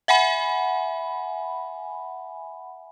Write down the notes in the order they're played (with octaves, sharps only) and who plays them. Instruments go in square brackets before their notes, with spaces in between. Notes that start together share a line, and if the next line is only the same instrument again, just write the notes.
[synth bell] E5 F#5 G#5 B5